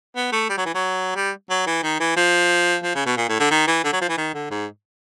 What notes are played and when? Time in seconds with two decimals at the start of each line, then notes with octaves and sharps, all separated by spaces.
0.16 B3
0.32 A3
0.49 G3
0.58 F#3
0.66 E3
0.74 F#3
1.16 G3
1.50 F#3
1.67 E3
1.83 D#3
2.00 E3
2.17 F3
2.84 F3
2.95 C#3
3.06 B2
3.17 A#2
3.29 A2
3.40 D3
3.51 D#3
3.67 E3
3.84 D3
3.93 F#3
4.01 F3
4.09 E3
4.18 D#3
4.34 D3
4.51 G#2